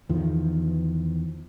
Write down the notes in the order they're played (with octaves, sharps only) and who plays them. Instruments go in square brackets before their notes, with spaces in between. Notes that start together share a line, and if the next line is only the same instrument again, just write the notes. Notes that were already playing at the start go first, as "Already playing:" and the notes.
[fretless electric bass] E2 D#3 F3